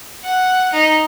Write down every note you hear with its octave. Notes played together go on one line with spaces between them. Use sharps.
F#5
D#4